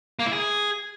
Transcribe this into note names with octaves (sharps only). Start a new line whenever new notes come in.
A#3
E4
G#4